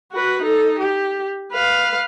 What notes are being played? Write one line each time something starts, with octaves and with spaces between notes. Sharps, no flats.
F#4 B4
D#4 A4
G4
B4 F5